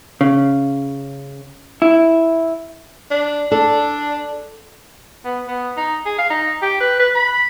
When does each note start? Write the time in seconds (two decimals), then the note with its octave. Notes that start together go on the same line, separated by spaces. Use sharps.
0.21 C#3
1.82 E4
3.11 D4
3.52 D4 A4
5.25 B3
5.48 B3
5.77 D#4
6.06 G#4
6.18 F5
6.30 D#4
6.62 G4
6.80 B4
7.00 B4
7.15 B5